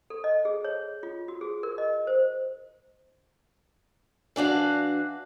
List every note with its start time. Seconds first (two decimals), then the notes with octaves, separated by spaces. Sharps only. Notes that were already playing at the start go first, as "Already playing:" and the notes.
0.10 A4
0.24 D#5
0.45 G#4
0.65 C#5
1.03 F4
1.28 F#4
1.41 G#4
1.63 A#4
1.78 D#5
2.07 C5
4.36 E3 D4 F#4 F5